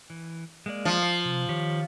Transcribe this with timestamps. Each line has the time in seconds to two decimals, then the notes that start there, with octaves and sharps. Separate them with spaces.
0.10 E3
0.66 G#3 A#3 D5
0.85 F3
1.03 C5
1.25 C3
1.49 D#3 G4 C#5